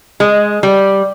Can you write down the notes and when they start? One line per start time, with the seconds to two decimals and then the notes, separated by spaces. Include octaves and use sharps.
0.20 G#3
0.63 G3